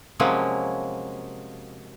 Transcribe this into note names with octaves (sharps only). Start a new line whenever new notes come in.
C3 F3 F#3 G#3 A#3 C#4